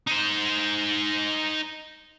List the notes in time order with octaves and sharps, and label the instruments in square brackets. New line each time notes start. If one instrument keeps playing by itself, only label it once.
[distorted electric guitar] D#4 C5